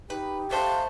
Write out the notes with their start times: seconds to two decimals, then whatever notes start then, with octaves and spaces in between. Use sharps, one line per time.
0.10 D#4 G4 B4
0.51 A3 C5 F5 A5